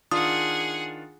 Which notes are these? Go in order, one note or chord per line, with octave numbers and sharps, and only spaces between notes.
D#3 D4 F4 G#4 F#5 D#6